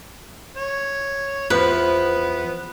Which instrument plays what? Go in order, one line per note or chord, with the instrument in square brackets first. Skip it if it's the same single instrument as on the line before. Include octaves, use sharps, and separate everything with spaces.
[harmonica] C#5
[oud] E2 F3 [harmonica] B3 [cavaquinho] B4